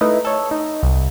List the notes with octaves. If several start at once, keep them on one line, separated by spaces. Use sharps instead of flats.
A3 D#4 E4 B4 D#5
A4 C#5
D#4
C2